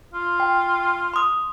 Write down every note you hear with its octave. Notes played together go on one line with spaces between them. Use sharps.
F4
G5
C6 D#6